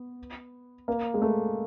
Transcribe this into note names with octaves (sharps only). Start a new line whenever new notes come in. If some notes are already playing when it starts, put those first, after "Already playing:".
Already playing: B3
A#3
G#3
A3